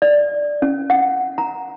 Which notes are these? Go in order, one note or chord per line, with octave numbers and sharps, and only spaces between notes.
D5
C#4
F#5
A#5